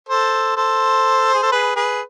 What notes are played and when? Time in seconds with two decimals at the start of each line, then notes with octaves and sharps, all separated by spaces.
0.08 A4 C5
0.56 A4 C5
1.34 G#4
1.43 A4
1.52 G#4 B4
1.76 G#4 B4